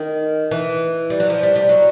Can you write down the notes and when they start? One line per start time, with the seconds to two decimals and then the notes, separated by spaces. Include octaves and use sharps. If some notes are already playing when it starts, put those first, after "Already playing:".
Already playing: D#3
0.51 E3
1.10 G3
1.20 F#3
1.30 F3
1.43 G3
1.56 G3
1.69 F#3